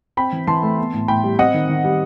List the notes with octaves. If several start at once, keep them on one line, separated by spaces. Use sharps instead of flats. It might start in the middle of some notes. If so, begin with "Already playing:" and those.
C4 G5 B5
E3
E3 A5 C6
A3
B3
A2
A2 G5 B5
G3
C4 D#5 F#5
D#3
D#3
G3